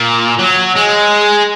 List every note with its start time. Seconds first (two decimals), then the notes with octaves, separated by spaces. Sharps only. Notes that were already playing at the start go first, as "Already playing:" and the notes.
Already playing: A#2
0.39 F#3
0.76 G#3